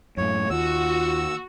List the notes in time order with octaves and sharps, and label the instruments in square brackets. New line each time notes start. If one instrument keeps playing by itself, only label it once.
[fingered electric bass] F#2 A2 [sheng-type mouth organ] C#5
[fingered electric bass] D#2 [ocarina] F4 [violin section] F#4 [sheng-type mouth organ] E6